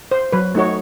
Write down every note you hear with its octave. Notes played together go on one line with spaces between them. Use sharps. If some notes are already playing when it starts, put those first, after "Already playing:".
C5
F#3 B4
A3 D#4 F#4 C#5